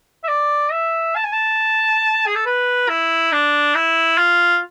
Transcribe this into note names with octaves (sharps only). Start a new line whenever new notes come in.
E5
D5
E5
A5
G#5
A5
G#4
A4
B4
E4
D4
E4
F4